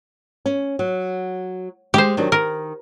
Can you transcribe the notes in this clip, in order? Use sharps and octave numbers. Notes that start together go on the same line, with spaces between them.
C#4
F#3
G#3 G4 C5
D#3 F#3 D4
D#3 A#4